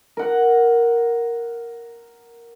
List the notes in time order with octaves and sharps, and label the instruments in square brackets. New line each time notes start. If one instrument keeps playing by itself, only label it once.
[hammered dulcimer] A#4 F#5